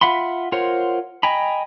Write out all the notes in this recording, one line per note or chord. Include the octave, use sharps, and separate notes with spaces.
F4 E5 F#5 B5 C6
F4 A#4 C5 C#5 F#5
D#5 G5 G#5 A#5 B5